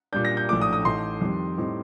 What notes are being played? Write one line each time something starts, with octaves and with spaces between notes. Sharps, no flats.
A#2 G3 D4 G6
A#6
G6
A#1 A2 A3 D4 D6
D#6
D#6
A1 A2 A3 D#4 C6
F2 D#3 G3
A2 G3 C4 D#4